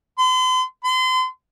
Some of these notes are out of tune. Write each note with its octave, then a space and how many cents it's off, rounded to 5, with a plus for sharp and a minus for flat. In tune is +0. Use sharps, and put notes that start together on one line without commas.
C6 -45
C6 -35